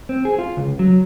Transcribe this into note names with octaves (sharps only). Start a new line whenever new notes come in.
C4
G#4
F4
C#2
F#3